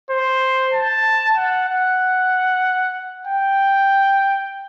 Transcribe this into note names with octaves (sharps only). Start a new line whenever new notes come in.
C5
A5
F#5
F#5
G5